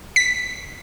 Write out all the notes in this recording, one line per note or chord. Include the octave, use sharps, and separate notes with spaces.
B6